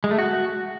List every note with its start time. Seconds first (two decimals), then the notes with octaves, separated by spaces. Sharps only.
0.04 G#3
0.11 A3
0.18 F#4